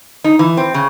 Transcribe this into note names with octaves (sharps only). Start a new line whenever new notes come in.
D#4
E3
C4
C#3